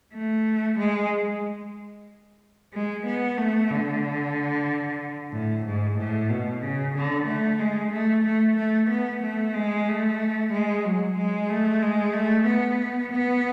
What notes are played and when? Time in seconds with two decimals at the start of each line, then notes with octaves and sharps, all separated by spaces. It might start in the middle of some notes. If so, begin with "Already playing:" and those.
0.14 A3
0.78 G#3
2.73 G#3
3.06 B3
3.38 A3
3.70 D3
5.32 A2
5.65 G#2
5.97 A2
6.30 B2
6.62 C#3
6.95 D3
7.27 A3
7.59 G#3
7.93 A3
8.24 A3
8.57 A3
8.90 B3
9.23 A3
9.55 G#3
9.88 A3
10.52 G#3
10.84 F#3
11.17 G#3
11.49 A3
11.82 G#3
12.14 A3
12.47 B3
13.12 B3